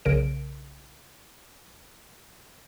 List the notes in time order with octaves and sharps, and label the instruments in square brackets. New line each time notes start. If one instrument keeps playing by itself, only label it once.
[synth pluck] B1 C#3 A#4 D7